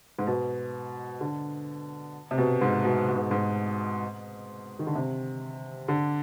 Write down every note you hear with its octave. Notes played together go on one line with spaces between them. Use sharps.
G#2
B2
D3
C3
B2
G#2
B2
B2
G#2
G#2
D#3
D3
C3
D3